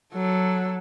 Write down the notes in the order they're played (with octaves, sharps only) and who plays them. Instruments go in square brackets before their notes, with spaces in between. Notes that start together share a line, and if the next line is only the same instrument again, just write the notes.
[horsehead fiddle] F#3 A4